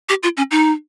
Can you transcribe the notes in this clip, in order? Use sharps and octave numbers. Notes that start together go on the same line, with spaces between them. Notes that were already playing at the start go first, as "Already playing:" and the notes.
G4
F4
C#4
D#4